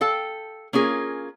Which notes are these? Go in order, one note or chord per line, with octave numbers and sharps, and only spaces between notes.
A4 F5 G5
A#3 C#4 F4 G#4 A#4